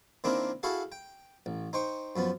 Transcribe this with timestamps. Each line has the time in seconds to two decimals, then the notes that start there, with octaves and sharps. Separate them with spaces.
0.24 D#3 A#3 C4 D4 E4 A#4
0.63 E4 F#4 G#4 A4 F5 F#5
0.92 G5
1.46 A1
1.73 D#4 C5 G5 C#6
2.16 F#2 F3 B3